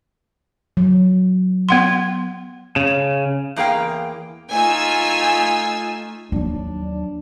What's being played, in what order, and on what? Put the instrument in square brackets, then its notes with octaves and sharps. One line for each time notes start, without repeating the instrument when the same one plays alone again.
[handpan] F#3
[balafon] B3 F#5 C6
[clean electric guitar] C#3
[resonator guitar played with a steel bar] E2 A#3 G#4 F5 G5
[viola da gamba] A3 D#4 F4 [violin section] G#5 E6
[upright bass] D#2 F#3 [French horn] D4